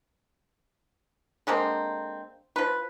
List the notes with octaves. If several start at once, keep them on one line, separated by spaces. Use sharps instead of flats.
D3 G#3 A#3 C4
F3 B4